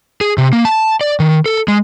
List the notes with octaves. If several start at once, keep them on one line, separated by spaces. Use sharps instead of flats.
G#4
C3
A#3
A5
D5
D#3
A4
G#3